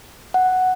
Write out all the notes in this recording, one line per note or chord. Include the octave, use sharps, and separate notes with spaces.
F#5